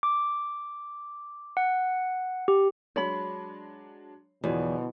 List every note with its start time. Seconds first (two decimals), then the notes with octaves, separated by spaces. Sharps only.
0.03 D6
1.57 F#5
2.48 G4
2.96 F#3 G#3 D4 C#5 B5
4.44 E2 B2 D3 F3 F#3